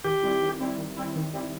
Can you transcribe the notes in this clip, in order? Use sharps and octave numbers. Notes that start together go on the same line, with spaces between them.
D#3 G4
G3 C4 E4
D#3
G3 C4 E4
D#3
G3 C4 E4
D#3
G3 C4 E4